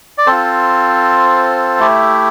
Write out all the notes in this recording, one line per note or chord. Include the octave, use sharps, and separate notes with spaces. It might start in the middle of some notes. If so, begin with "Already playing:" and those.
D5
C4 F4 A4 C5
A3 E4 G4